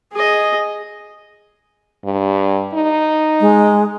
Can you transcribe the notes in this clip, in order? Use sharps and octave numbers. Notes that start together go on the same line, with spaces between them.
G#4 D#5
G2
D#4
G#3